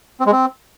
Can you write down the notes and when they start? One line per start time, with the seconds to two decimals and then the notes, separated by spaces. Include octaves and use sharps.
0.20 C4
0.26 G#3
0.32 C4